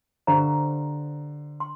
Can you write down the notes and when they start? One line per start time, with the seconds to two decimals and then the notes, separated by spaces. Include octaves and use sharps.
0.27 D3 G4 C5 F5 A#5
1.60 C6